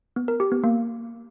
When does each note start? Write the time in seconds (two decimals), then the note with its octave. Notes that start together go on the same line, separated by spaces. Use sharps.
0.16 B3
0.28 A#4
0.40 G4
0.52 B3
0.64 A#3